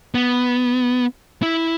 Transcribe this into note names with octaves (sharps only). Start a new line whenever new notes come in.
B3
E4